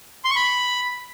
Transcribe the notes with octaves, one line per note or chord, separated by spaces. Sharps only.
C6
C#6
B5